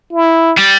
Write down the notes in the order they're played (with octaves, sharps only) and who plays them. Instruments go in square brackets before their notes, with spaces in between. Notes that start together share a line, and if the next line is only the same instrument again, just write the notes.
[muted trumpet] E4
[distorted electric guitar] G3